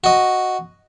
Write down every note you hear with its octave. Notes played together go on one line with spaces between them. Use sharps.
F#4 D#5